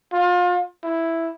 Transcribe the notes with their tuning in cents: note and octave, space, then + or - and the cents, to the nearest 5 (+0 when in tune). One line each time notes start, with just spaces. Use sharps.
F4 +30
E4 +0